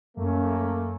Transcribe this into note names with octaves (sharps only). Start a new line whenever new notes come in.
F#2 A3 A#3 C#4